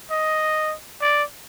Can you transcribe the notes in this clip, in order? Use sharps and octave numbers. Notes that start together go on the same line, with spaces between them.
D#5
D5